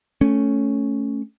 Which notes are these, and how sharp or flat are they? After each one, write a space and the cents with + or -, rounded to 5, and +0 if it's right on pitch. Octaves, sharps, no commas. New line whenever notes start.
A3 +0 C#4 +0